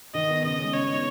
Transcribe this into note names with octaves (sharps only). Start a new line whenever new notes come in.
D#3 D#5
B3 D#4
C#3 D#5
G#3 C#4
C#3 C#5
B3 D#4